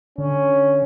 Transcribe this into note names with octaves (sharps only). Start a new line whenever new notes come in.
D3 C#4